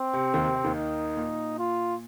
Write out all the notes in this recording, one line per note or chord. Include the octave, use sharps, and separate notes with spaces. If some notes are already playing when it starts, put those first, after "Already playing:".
Already playing: C4
C3
D#2 D#3
C3
C3
D#2 D#3
D#4
A#2
F4